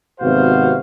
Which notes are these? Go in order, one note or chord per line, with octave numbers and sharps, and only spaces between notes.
G#1 C3 B3 F#4 C5 F5